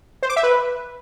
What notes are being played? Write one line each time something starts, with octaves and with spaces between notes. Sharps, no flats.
C5
D6
E5
B4